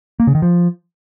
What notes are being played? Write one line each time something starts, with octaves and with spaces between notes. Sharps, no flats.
A#3
C#3
D#3
F3